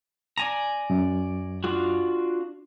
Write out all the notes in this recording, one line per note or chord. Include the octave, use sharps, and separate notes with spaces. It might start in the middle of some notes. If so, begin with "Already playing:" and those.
D5 G#5 A#5
F#2
D4 F4 F#4